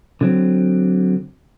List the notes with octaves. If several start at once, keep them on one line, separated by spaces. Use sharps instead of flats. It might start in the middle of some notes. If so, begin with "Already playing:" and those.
D3 F#3 C4